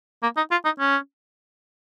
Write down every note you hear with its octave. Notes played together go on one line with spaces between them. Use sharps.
A#3
D#4
F4
D#4
C#4